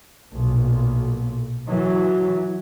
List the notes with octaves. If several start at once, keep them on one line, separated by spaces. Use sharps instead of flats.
B1 A#2
E3 F#3